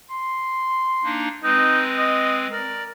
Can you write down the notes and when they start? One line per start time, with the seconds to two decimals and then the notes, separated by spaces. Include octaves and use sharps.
0.10 C6
1.04 A#3 D4 D#4
1.43 G#3 C4 D#4 B4
1.98 D#5
2.52 A#4 D5